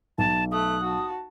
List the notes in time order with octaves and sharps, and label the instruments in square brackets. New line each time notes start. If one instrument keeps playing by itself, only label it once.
[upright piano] B1 [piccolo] A5
[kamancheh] A3 F#6 [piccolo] D#6
[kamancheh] F#4 A5